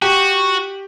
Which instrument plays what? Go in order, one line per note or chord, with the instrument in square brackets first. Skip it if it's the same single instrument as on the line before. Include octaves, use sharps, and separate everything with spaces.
[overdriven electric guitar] F#4 [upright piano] G4